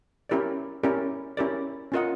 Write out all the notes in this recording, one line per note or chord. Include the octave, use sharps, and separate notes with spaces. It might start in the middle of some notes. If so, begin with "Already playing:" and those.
C#4 E4 G4 A#4 D5
C#4 E4 G4 A#4 D5
C#4 E4 G4 A#4 D5
C#4 F4 A#4 D#5 F#5